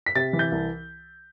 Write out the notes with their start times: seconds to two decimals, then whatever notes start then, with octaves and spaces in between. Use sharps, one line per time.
0.06 B6
0.15 C3 A6
0.33 E3
0.39 G6
0.52 C2